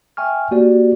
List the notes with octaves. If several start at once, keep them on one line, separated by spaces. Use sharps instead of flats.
E5 G5 G#5 C#6 F6
A#3 F#4 G4 D5